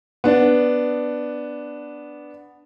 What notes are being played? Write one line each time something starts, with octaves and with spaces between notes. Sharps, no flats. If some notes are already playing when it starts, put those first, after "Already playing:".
B3 D4